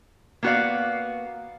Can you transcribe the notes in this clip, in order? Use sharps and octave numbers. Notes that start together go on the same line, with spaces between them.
A#3 B3 F#4 G#4 D5 F5